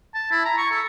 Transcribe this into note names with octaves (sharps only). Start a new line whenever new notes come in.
A5
E4
A#5
C#6
A4